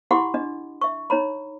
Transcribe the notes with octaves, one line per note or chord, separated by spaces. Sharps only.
E4 G4 F#5 B5 C6 D6
D4 D#5
E5 C#6
D#4 C#5 A#5 B5